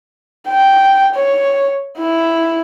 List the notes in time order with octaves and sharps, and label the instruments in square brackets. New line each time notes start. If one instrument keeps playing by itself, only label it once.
[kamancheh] G5
C#5
E4